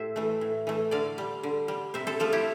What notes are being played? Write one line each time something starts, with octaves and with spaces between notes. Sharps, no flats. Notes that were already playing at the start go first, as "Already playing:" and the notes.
Already playing: A2 G4 C5 E5
E3 A3
A2
E3 A3
D3 D5 F5
G3
D3
G3
C3 C5 E5
A4 C5
F3 A3 F4 A4
E4 G4